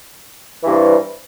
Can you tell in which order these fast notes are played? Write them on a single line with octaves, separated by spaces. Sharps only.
E3 G2 C3